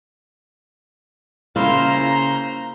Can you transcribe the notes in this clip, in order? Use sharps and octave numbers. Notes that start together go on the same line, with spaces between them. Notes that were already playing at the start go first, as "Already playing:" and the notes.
C#3 A#3 E4 F4 C5 A#5